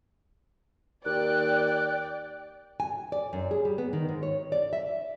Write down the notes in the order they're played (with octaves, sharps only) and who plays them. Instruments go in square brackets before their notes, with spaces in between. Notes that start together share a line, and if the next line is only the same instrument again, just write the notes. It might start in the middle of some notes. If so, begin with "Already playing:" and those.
[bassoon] D#2 [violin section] D5 G5 [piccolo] F#6
[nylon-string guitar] G#5
D5
F#2
G#4
G3
B3
D#3
G#2
C#5
D5
E5